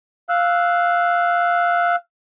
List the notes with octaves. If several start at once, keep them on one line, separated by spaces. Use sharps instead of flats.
F5 E6 F#6